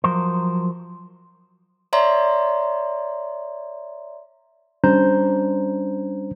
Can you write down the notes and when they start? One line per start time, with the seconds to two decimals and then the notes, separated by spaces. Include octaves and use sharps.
0.04 F3 F#3 A#4 C5
1.93 C#5 D5 E5 A#5 C6
4.84 G3 C#4 D4 C5 A#5 G6